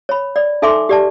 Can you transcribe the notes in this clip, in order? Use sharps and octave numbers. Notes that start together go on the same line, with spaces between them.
C#5 B5
D5
D#4 A4 E5 G#5 C6 D6
G4 D5 A5